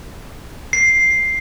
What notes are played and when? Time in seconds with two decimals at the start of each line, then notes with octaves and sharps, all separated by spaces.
0.73 C7